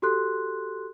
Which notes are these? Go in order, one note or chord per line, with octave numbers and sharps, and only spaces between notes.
F#4 G4 A4 C6 F#6